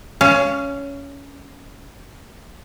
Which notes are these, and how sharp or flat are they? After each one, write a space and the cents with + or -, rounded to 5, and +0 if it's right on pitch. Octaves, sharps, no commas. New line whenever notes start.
C#4 +15 F5 -20